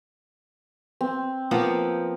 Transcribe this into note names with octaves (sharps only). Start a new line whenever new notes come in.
C4
F3 A#3 B3